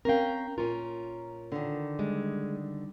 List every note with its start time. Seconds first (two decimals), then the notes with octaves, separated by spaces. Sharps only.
0.05 C4 C#4 A#4 F5 G5
0.58 A#2 C#4 F4 A#4
1.52 D3 D#3
1.99 G3 G#3